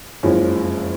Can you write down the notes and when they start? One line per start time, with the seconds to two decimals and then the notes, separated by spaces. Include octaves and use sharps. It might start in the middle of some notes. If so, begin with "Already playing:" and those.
0.23 F#1 F2 F3 G#3 C#4